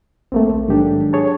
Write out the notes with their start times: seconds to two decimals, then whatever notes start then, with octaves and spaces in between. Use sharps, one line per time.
0.32 A#1 A3 A#3 C4
0.49 D2
0.68 G#2 D#3 F#3 D4 G4 A4
1.13 G#4 C#5 A5